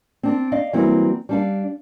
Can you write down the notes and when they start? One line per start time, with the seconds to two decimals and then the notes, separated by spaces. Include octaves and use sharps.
0.23 C4 D4
0.52 D5 D#5 F5
0.73 E3 F#3 G3 A#3 C4 E4
1.29 G3 D4 F5